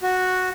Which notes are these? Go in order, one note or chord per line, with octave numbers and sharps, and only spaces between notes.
F#4